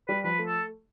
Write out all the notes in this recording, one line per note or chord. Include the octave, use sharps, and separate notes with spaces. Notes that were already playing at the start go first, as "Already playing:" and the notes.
G3 B4
F3 B4
A3
A4